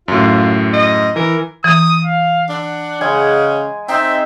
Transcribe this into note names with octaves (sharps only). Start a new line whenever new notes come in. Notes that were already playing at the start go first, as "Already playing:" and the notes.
F#2 A2 F4
D#5
E3 A#4
E3 D#6
F5
D4 F#5
C#3 G#3 G#5
C4 D#4 E5